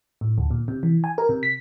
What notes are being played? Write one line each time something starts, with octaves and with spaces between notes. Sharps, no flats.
A2
D2
A#2
C3
E3
G#5
A#4
C3
B6